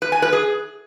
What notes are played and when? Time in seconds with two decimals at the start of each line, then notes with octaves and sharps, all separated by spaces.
0.02 B4
0.12 G#5
0.22 B4
0.33 G#4